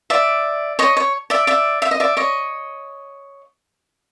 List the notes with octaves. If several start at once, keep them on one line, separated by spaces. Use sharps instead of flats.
D5 E5
C#5 D#5
C#5
D5 E5
D5 E5
E5
D#5
D5 E5
C#5 D#5